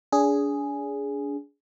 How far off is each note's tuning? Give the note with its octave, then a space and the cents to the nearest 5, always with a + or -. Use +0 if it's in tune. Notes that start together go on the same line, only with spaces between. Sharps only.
D4 -35 G#4 +0